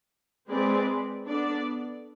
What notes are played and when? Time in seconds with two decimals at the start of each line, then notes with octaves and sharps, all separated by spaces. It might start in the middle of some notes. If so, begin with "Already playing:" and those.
0.50 G#3 C4 G#4 B4 D5
1.27 B3 D4 A4 D5